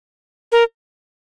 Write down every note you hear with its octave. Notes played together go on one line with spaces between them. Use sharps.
A#4